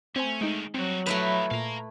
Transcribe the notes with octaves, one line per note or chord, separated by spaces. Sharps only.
A3 C4 C#4 C5 G#5
D2 D#3 G#3 D#4
G2 F#3 C4 F#4
F3 A3 E4 A#4 B4
A#2 F5 A#5